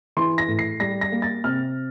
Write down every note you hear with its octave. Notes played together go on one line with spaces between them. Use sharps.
E3 C6
A#6
A2
C7
G3 A#6
A#6
A#3
A6
C3 F6